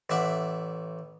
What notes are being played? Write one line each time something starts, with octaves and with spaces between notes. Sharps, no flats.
A1 D5 E5 F#5